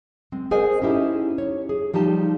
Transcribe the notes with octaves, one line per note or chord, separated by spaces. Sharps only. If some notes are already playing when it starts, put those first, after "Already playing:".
G#3 C4
G#4 A#4 C5 D#5 F#5 G#5
C#4 D#4 E4 G4 A4
C#5
G#4
F3 G3 D#4 G4 A5